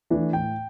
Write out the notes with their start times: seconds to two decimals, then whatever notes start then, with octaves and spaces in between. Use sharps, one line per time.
0.10 E3 A3 D4
0.33 A2 G5